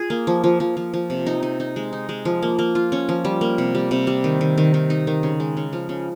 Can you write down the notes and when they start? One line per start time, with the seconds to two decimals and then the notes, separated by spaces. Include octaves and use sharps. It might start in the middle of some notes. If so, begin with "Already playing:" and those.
Already playing: F4 G#4
0.10 A#3
0.27 F3
0.44 F3
0.60 F3
0.77 F3
0.94 F3
1.10 C3
1.26 D#4
1.43 D#4
1.60 D#4
1.76 G#3
1.93 D#4
2.09 G#3
2.25 F3
2.43 A#3
2.59 A#3
2.75 F4
2.92 C#4
3.09 F3
3.25 G3
3.41 A#3
3.58 C3
3.75 G3
3.91 C3
4.07 G3
4.24 D#3
4.41 D#3
4.58 D#3
4.74 D#3
4.90 D#4
5.07 D#3
5.23 C#3
5.40 G#3
5.57 C#3
5.73 F3
5.89 C#3